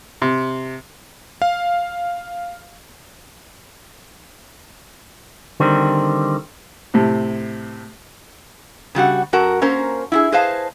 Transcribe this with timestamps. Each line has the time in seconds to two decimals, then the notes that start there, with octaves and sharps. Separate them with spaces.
0.22 C3
1.42 F5
5.60 D3 D#3 G3 C4
6.94 A2 C3
8.95 C#3 G3 F#4 F#5
9.33 F#2 F#4 A#4 F#5 A5
9.61 A#3 C#4 A#4 C5
10.12 E4 F4 G#4
10.32 G#4 B4 C5 D#5 F5 A5